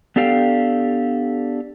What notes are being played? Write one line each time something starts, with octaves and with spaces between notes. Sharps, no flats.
B3 D4 G4 A4 F5 G5